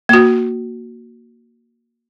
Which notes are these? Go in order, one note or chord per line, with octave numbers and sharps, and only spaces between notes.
A#3 F#4